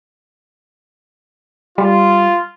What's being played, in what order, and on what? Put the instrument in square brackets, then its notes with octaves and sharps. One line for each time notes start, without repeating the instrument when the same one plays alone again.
[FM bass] G3 [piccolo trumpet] F4